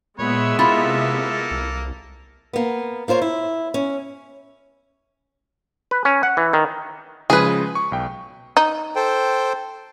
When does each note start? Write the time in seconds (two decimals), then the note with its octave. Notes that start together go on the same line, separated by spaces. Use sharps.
0.19 A#2 G#3 B3 B4 C#5 E5
0.59 C3 A#3 E4 F4 A4
1.51 C2
2.53 A#3 B3
3.08 A#3 F4 C5 C#5
3.22 E4
3.74 C#4
5.91 B4
6.05 C#4
6.23 F#5
6.37 E3
6.53 D#3
7.30 C#3 F3 G#3 G#4 B4
7.75 C#6
7.92 B1 G5
8.57 D#4
8.96 A4 C5 G5